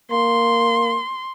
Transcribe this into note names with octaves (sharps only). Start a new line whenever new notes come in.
A#3 C6